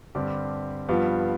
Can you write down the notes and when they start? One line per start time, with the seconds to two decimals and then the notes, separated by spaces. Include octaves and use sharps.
0.15 G2 D3 G3 C4 G4
0.89 G2 F3 B3 F4